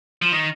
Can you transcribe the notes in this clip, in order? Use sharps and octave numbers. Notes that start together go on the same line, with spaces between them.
F3
D#3